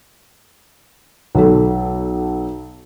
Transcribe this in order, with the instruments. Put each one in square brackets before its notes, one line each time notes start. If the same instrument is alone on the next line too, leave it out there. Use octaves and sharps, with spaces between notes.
[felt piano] B1 A4